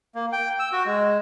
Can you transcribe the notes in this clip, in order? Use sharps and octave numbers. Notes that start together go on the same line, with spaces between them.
A#3
G5
E6
F#4
G#3